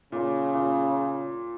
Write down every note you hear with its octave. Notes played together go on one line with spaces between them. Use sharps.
A#2 C#3
A#2